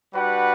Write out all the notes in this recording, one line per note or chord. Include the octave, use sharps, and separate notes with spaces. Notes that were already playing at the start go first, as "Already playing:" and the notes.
G3 D4 F#4 B4 F#5